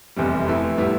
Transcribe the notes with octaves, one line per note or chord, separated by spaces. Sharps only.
F1 E2 C3 G3
F2 E3 A3 E4
A2 G3 B3 E4